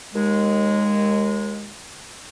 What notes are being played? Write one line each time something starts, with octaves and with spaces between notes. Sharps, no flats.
D#2 G#3